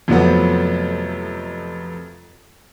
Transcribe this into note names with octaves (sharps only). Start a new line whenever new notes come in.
F2 C3 F3 F#3 A3 B3